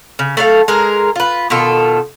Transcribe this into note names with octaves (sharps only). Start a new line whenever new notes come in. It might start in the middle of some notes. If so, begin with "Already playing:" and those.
C#3
A3 A4 F5
G#3 G#4 A#4
F4 B4
B2 D#3 F4 A4